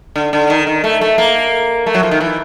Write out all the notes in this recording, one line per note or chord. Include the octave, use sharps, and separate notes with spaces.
D3
D3
D#3
D#3
A3
A3
A#3
A3
F#3
F3
D#3
E3